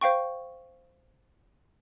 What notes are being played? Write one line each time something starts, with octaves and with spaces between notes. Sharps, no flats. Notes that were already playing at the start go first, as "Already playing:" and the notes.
C5 F5 G5 C#6